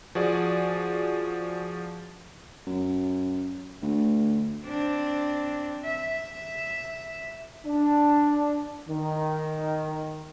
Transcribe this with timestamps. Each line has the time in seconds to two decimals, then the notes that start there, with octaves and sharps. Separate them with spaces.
0.15 F3 F#4 G#4 D5
2.67 F#2
3.82 D2
4.65 C4 D4
5.85 E5
7.65 D4
8.89 D#3